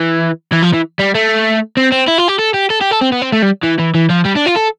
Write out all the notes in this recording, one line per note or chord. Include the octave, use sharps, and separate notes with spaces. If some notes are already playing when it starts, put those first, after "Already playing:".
Already playing: E3
E3
F3
E3
G3
A3
C4
C4
E4
F4
G4
A4
G4
A4
G4
A4
C4
B3
C4
A3
G3
E3
E3
E3
F3
G3
D4
F4
A4